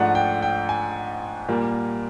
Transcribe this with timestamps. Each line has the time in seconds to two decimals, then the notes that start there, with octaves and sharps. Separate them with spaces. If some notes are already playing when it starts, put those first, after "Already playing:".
Already playing: G#2 F3 A3 D4 F#5
0.15 G5
0.42 G5
0.69 G#5
1.48 A#2 G3 A#3